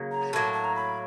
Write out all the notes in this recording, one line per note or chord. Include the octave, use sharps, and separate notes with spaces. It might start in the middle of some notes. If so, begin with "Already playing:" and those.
Already playing: C#3 F#3 A#3
A#5
A2 F#3 A#3 A5
A5
A#5
B5